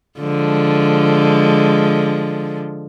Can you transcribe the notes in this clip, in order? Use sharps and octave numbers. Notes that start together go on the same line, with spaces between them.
D3 F3 G#3